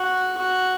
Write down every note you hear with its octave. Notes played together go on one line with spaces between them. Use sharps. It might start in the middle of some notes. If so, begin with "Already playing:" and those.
Already playing: F#4
F#4